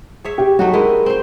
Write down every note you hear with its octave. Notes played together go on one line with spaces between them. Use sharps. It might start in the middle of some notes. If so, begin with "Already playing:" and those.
G#4 C#5 E5
G4
F#3 A3 D#4 F#4
G#3 E4 A#4 D#5
C4 C5